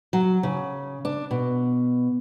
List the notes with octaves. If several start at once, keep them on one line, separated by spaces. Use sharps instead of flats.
F#3
C#3
D4
B2